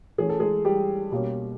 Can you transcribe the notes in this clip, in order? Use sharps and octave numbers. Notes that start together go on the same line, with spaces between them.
E3 A3 C#4 G#4
A4
G#3 G#4
G3 G4
B2 G3 A#3 C#4